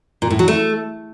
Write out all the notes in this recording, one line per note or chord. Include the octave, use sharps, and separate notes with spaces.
A#2
A2
F#3
A3